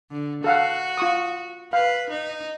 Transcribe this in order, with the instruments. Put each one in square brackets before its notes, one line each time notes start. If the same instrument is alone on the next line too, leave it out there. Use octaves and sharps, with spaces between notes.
[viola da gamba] D3
[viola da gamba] F#4 [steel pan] A4 F5 F#5
[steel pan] F4 C#6 D#6
[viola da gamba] B4 [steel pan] F5
[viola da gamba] D#4